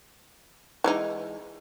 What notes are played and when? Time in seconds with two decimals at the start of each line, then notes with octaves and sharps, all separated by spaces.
0.84 E3 G#3 D#4